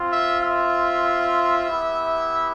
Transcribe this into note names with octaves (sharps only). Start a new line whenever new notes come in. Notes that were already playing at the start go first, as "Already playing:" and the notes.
Already playing: C4 F4
E5
E5
B3 E4 G4